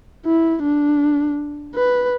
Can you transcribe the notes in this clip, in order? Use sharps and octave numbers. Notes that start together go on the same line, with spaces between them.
E4
D4
B4